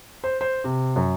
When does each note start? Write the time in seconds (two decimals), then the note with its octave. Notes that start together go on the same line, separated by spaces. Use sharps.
0.24 C5
0.41 C5
0.64 C3
0.96 F#2